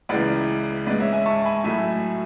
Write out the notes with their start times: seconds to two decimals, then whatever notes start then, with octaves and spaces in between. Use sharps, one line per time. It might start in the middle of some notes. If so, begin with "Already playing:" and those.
0.09 C#2 C#3 E3 G#3 B4 D5
0.86 G#2 B4 D5
0.91 G#3
1.00 C#5 E5
1.13 E5 G#5
1.26 A5 C#6
1.45 G#5 B5
1.64 A2 F#3 A3 E5 G#5